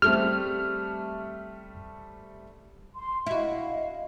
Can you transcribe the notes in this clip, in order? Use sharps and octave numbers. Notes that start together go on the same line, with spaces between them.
G3 A3 C4 F6
C6
E4 F#4 D#5 F5